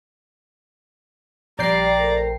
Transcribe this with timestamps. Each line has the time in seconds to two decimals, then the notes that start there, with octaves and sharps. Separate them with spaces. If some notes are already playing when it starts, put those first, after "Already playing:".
1.59 A#1 G3 D5 G5 A#5 C7
1.97 C3 A3 A#4